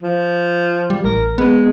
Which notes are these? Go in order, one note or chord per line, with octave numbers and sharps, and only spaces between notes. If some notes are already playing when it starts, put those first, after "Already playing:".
F3
G3
A1 A#4
G#3 B3